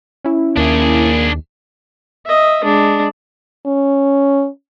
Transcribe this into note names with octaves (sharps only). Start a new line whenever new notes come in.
C#4 E4
D#2 A#3 D4 G#4
D#5 E5
G#3 D4
C#4